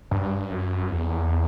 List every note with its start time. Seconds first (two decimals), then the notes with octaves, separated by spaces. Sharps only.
0.11 G2
0.51 F#2
0.90 E2